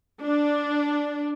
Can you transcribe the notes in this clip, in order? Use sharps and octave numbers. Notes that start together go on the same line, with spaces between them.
D4